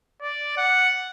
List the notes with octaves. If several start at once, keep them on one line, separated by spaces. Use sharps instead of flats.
D5
F#5